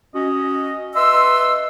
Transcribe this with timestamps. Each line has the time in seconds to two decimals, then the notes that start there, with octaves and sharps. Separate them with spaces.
0.15 C#4 F#4 D#5
0.95 B4 D#5 E5 C6 E6